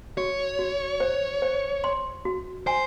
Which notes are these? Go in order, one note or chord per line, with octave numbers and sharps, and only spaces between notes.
F#4 C#5
F#4
C5
C5
C6
F#4
C5 G#5